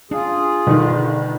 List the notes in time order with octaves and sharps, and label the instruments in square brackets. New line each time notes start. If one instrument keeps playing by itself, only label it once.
[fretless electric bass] D4 [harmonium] F4 G#4
[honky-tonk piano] G1 D#3 [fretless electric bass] B2 D3 G3